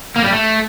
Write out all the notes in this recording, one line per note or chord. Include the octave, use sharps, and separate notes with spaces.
A#3
G3
A3